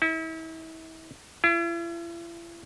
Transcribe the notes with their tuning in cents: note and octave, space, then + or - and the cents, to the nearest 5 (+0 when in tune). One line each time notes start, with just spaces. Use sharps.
E4 -35
E4 +45